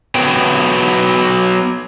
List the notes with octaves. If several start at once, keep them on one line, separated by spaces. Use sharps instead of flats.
F#3 B3 G5